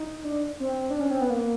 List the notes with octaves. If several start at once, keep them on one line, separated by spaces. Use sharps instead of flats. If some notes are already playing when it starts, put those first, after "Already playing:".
Already playing: D#4
D4
C4
D4
C#4
C4
B3
A#3